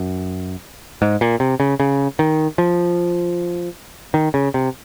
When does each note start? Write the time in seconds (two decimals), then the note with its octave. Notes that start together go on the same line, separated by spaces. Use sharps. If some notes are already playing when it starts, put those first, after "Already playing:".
Already playing: F#2
1.02 G#2
1.21 A#2
1.40 C3
1.60 C#3
1.80 C#3
2.19 D#3
2.58 F3
4.14 D#3
4.34 C#3
4.54 C3